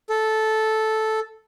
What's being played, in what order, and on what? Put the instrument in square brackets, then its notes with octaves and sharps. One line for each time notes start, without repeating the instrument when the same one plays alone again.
[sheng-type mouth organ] A4